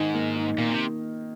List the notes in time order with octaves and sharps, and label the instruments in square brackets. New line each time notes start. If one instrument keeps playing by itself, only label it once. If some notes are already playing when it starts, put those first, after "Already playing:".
Already playing: [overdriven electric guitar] G#2 [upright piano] D#3 D#4
[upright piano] A#3
D#4
[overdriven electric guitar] A#2 [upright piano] A#3
[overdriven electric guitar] C3